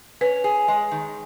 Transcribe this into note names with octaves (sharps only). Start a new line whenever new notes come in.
C#4 B4
G#4
G#3
D#3